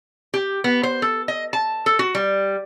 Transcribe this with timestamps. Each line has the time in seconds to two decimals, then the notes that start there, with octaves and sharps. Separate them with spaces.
0.34 G4
0.64 B3
0.83 C5
1.02 A4
1.28 D#5
1.53 A5
1.86 A4
1.99 F#4
2.15 G3